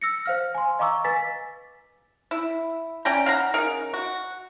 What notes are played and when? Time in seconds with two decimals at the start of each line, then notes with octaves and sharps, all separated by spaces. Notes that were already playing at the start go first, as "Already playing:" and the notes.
0.02 E6 A#6 C#7
0.26 C5 F5 F6
0.55 G#5 C6
0.79 D#5 F5 A#5 C#6 D6 E6
1.05 B4 G#5 A6 B6
2.31 E4
3.05 C#4 D5 G5 A#5
3.26 F5 F#5 A#5
3.54 C#3 D#4 A#4
3.93 F#4